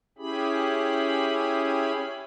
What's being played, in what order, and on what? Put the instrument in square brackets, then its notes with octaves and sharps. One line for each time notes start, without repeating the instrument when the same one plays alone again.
[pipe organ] C#4 E4 G4 G#4 B5